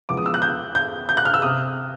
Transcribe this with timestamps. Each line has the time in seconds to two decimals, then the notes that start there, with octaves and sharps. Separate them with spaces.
0.09 E2 C#3 F3 G#3 B3 D6
0.17 D#6
0.26 E6
0.34 F#6
0.42 G6
0.75 G6
1.09 G6
1.17 F#6
1.25 F6
1.34 E6
1.42 C3 D#6